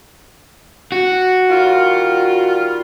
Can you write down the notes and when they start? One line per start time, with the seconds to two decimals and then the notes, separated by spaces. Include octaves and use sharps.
0.92 F#4
1.50 D#3 G3 F4